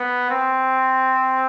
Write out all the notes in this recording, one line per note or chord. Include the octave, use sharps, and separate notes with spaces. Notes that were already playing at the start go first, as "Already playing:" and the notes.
Already playing: B3
C4